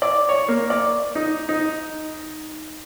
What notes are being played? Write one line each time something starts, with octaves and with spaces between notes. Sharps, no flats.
D5
C#5
A#3
D5
D#4
D#4